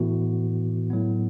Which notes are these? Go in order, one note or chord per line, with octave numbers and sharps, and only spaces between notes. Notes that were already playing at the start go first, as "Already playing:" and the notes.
Already playing: A2 E3 B3 F#4
A2 F#3 B3